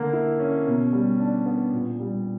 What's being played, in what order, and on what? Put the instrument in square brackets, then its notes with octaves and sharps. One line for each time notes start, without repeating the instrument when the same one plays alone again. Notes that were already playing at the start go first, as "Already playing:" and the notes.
Already playing: [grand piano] D3 A#3
E4
C#4
B2
G3
D4
B3
A#2
G3